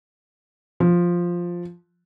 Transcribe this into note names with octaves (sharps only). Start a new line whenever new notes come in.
F3